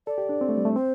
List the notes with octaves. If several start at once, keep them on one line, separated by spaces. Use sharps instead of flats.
A4 D5
G4
D4
C4
A3
G3
A3
C4 C5